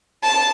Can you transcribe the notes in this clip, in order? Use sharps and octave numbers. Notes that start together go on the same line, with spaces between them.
A5